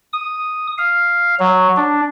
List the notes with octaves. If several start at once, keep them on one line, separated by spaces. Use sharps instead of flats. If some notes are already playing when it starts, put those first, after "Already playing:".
D#6
F5
F#3
D4